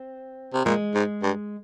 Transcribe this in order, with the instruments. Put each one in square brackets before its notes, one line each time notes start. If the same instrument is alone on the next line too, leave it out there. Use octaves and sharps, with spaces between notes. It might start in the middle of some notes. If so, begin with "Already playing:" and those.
Already playing: [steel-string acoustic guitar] C4
[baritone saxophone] C3
[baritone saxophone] A#2 [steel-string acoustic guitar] G#3
[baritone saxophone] G#2
G2